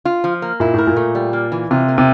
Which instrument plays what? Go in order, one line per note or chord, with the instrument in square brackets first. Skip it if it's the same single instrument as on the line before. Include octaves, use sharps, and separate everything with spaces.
[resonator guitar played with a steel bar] F4
F3
A#3
[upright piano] A#2 [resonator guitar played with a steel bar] E4
[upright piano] A2 [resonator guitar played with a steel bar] A#4
[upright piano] A#2
[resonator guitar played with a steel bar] A3
G3
A#3
E3
[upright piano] C3 [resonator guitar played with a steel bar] F4
[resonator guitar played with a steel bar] A#3
[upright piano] C3